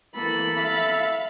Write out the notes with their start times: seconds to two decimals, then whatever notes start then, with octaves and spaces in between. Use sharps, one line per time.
0.16 E3 A#3 A4 B5
0.57 E5 F5